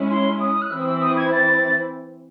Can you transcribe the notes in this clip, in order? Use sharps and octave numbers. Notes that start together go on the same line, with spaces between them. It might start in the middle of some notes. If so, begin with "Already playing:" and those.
Already playing: G#3 C#4 E4
C6
D#6
F#6
E3 C4 E4 E6
D#6
E6
D#6
G#6
A6